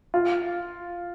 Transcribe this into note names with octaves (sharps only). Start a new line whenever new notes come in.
F4